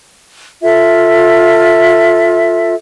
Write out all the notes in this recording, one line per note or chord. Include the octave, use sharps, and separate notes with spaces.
F4 A4 E5